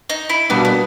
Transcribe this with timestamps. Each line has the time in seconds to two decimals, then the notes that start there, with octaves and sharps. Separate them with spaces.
0.10 D#4
0.30 E4
0.49 B2 G3 A#3 B3 D4
0.65 B3